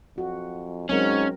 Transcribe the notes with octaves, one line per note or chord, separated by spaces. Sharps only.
F2 F#4
G#2 F#3 C4 C#4 A#4